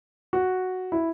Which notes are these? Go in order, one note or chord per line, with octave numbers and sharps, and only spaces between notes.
F#4
E4